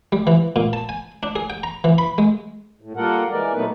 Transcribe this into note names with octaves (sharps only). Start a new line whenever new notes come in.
G3
E3
A#2
A5
G#5
D4
G#4
G5
A#5
E3
B5
G#3
A2
G3 A#3 F4 A4 A#4 F#5
E3 G#3 A#4 D5
A#2 F#3 A3 B3 D#4 B4